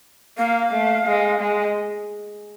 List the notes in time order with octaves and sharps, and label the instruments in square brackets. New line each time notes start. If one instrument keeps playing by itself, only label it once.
[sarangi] A#3 [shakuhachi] F5
[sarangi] A3
G#3
G#3